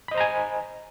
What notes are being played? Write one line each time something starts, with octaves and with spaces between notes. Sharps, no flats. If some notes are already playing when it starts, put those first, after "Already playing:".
C5 D#5 G#5 A#5 B5